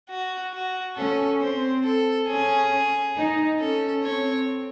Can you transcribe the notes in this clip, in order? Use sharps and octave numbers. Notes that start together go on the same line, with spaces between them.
F#4
F#4
C#4 A4
C4 C5
A4
C#4 G#4
D#4
C#4 A4
C4 C#5